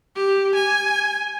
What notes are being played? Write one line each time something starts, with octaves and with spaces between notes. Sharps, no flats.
G4
G#5